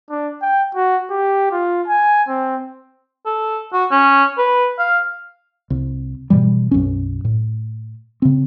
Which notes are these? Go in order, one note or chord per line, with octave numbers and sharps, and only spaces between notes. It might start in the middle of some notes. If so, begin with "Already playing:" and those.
D4
G5
F#4
G4
F4
G#5
C4
A4
F#4
C#4
B4
F5
C2
G#2 B2 E3 G3
B1 F#2 C#4
A2
C#3 C4